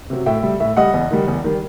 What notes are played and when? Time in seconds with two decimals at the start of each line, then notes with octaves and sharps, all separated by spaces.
0.10 C3 F#3
0.26 A2 E5 G5
0.43 G3
0.60 A2 E5
0.77 G3 D#5 F#5
0.94 E2
1.11 D#3 G3
1.28 E2
1.44 D#3 G3